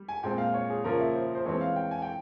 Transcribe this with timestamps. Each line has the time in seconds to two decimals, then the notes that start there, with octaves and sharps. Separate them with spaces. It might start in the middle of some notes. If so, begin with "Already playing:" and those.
Already playing: G3
0.09 G#5
0.23 A#2 G#3 C4 G5
0.38 F5
0.54 C#5
0.70 G#4
0.84 C#3 F3 A#3 A#4
0.92 C#5
0.99 E5
1.15 C5
1.35 C5
1.46 E3 G#3 C4 C#5
1.61 F5
1.76 G5
1.91 G#5
2.02 G5